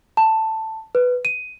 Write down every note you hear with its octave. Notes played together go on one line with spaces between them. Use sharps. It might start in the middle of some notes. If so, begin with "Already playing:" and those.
A5
B4
D#7